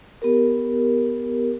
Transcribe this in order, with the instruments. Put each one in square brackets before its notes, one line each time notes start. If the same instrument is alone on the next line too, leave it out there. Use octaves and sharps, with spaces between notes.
[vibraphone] B3 G4 A#4